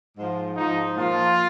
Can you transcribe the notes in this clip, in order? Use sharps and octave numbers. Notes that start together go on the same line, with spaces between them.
G#2 F3
G#2 F3 D#4
A#2 F3 F4